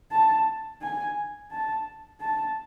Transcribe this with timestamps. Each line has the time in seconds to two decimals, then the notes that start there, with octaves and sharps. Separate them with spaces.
0.11 A5
0.82 G#5
1.51 A5
2.20 A5